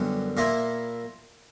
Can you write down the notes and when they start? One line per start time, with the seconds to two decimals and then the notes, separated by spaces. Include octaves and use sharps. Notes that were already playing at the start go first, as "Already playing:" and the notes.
Already playing: F#2 D3 G3 B3
0.37 A#2 A#3 E4